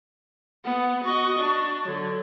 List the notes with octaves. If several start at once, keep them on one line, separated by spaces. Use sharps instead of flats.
B3 F#5
F#4 D#5 C#6
D4
D3 F#3 C#5